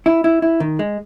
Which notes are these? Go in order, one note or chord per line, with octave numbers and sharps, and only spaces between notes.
E4
E4
E4
D#3
G#3